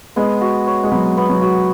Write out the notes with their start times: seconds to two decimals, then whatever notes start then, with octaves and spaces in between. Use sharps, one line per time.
0.16 G#3 B3
0.41 F#4
0.67 C#5
0.83 G#3
0.91 F#3 B3
1.17 B3
1.29 F#3
1.42 F#4